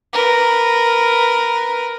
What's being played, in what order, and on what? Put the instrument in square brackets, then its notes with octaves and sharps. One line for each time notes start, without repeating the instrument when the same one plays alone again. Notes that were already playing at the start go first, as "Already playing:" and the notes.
[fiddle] A#4 B4